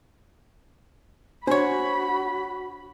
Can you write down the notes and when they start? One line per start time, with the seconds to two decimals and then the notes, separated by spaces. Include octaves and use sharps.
1.47 D4 F#4 C5 C#5 B5